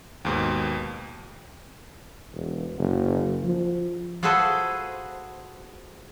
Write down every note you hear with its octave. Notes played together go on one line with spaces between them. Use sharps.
D#2 G#2 B2
E1
F#1
F3
F4 F#4 G#4 A4 B4 C5